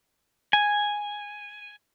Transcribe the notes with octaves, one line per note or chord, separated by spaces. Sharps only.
G#5